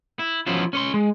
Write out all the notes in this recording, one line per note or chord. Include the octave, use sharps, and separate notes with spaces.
E4
F3 F#3 B3 C#4 E4 F4
C#4 C#5 C6
G#3